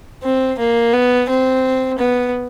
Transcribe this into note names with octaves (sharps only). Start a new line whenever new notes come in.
C4
A#3
B3
C4
B3